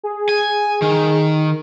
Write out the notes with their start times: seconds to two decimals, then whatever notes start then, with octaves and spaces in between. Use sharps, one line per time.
0.03 G#4
0.29 G#5
0.82 D#3